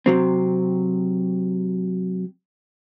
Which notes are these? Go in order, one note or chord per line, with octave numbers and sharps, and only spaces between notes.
C3 F#3 C4